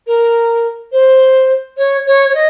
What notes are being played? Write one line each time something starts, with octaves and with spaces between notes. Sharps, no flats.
A#4
C5
C#5
C#5
C#5
D#5